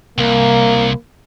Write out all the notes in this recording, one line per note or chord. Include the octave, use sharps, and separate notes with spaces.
C2 A#3